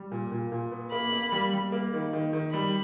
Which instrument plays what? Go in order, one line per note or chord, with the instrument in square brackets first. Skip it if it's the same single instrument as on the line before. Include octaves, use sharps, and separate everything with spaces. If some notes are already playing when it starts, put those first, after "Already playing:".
Already playing: [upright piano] G3
A#2
A#2
A#2
B3
[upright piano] A#3 [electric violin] B5
[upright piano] A#3
G3
G3
A#3
D#3
D#3
D#3
[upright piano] G3 [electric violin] B5